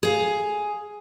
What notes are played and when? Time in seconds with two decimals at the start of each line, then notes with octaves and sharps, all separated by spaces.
0.03 G#4 F5